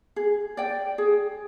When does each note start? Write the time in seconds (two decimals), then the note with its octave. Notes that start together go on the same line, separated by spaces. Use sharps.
0.16 G#4
0.57 D5 G5
0.98 G#4